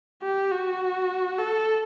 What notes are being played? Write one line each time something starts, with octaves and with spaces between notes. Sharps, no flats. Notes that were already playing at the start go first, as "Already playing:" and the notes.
G4
F#4
A4